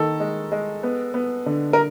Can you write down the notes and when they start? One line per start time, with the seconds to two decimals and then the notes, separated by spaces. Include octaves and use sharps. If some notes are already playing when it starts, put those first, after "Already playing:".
Already playing: D#3 A#3 A4
0.20 G#3
0.52 G#3
0.83 B3
1.14 B3
1.46 D3
1.73 A#4